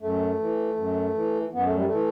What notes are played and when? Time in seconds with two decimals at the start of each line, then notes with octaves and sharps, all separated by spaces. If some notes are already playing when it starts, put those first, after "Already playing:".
0.01 F#2 A3
0.40 E3
0.77 F#2
1.15 E3
1.53 F#2 B3
1.65 A3
1.75 G3
1.86 A3
1.91 E3